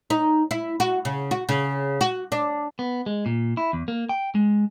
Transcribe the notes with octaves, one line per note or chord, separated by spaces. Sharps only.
D#4
E4
F#4
C#3
F#4
C#3
F#4
D4
B3
G#3
A#2
E4
E2
A#3
G5
G#3